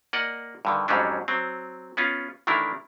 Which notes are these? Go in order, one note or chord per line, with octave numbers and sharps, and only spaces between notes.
A#3 D5 D#5 F#5
G2 D3 D#3
F2 G#2 F#3 G3 C#4 D4
F#3 C4
B3 C#4 F4
D#3 E3 A3 D4 E4 A#4